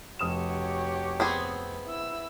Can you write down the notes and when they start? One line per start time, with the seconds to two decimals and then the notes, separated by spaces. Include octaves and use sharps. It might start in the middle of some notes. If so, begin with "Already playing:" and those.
0.19 F1 F#4 G4 C#5 D#6 E7
1.20 B3 C4 G#4
1.86 E4 E6